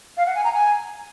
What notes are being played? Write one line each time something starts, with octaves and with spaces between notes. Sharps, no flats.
F5
F#5
G#5
A#5
G#5